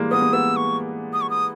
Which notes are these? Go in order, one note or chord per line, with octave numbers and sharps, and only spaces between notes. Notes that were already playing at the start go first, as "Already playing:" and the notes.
Already playing: E3 G3 G#3 A#3
B3 D#6
A#3
B3 E6
C#6
D#6
C#6
D#6